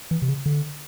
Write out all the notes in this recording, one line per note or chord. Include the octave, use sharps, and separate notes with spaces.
E3
C3
C#3
D3